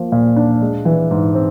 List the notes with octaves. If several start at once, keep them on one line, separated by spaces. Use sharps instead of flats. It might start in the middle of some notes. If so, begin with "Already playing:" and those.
Already playing: F3 A#3
A#2
D4
G#3
E3
G#2
C4